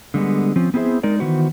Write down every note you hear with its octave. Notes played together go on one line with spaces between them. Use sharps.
D3 G3 G#3 B3
F3 C4 C#4
B3 C4 E4 G#4 C5 E5
G#3 D#4 A#4 D5
D#3 E3 B3 F#4 C5